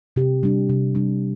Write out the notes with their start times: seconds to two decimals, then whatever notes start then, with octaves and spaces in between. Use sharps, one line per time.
0.16 C3 G4
0.43 G3 D4
0.69 C3
0.95 G3 D4